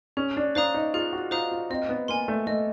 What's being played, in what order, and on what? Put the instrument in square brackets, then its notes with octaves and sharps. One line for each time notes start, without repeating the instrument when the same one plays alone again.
[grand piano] C#4 [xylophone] G#4
[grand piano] D4
[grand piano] D4 [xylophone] C5 F5 A#5 D#6
[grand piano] D#4
[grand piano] F4 [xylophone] G#4
[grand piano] F#4
[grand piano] F4 [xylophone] C5 F5 A#5 D#6
[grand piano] F4
[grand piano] C4 [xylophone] D#5
[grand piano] B3
[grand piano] A#3 [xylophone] G#5 C6
[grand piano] A3
[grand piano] A3 [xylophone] D#5